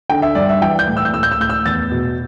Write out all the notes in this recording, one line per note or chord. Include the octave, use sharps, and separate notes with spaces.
D3 G5
E5
G2 D5
E5
E3 G5
G6
A2
E6
G6
A2 E6
G6
E6
A2 G6
E6
E2 A6
B2